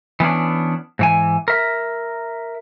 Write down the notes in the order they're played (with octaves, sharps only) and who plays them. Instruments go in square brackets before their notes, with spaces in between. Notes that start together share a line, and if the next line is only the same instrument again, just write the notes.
[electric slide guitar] E3 B3 C#4 D4
G#2 E3 G#5
A#4 E5